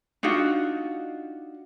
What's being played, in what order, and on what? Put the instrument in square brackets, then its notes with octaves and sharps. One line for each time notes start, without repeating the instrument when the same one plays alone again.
[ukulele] D4 D#4 F4 F#4